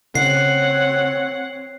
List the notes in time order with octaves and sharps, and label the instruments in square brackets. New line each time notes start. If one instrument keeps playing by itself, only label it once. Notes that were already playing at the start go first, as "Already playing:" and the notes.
[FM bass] C#3 [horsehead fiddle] C4 C#5 [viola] F#5 [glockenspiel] C7